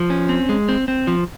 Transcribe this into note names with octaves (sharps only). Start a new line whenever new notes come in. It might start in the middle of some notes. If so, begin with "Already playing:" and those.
Already playing: F3
C#4
C4
G#3
C4
C4
F3